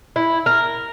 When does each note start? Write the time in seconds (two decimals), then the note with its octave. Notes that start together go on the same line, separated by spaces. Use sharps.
0.16 E4
0.46 A#4